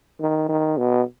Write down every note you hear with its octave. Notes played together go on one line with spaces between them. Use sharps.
D#3
D#3
B2